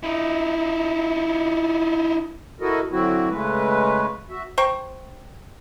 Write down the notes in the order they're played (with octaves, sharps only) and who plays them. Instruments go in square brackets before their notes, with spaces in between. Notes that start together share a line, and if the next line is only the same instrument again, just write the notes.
[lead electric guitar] D#4 E4
[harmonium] E4 F#4 A4 A#4 D#5
D3 F#3 C4 E4 F#4
C#3 G#3 A3 B4
F#4 E5
[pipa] C5 G5 A#5 C#6